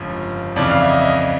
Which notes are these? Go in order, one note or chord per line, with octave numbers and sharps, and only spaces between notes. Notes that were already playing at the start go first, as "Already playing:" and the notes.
Already playing: G1 F2 C#3 F3 G#3
F2 C#3 E3 D5
F5
E5
D#5
E5
D#5